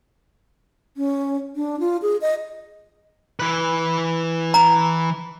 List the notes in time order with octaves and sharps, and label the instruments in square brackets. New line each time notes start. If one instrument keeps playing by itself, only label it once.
[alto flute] C#4
D4
F4
G#4
D#5
[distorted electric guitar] E3 B4
[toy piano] A#5